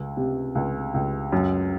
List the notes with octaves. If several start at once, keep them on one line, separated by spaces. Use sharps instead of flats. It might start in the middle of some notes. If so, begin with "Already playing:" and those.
Already playing: C#2
C3
C#2
C#2
F#2